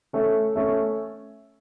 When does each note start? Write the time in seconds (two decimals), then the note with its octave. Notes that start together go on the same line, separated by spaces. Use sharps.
0.13 A3 C#4 A4 E5
0.56 A3 C#4 A4 E5